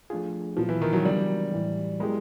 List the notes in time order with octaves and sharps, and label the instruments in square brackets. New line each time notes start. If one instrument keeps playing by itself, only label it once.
[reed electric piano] F3 A3 D4 F4 G#4
[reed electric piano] A#2 F#3 B3 [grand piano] F3
[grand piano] E3
D#3
F#3
[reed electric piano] C#3 E3 G#3 B3 D4 [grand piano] G3
[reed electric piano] A2 E3 G3
[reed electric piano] F#3 B3 E4 G4 A#4 [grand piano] G#3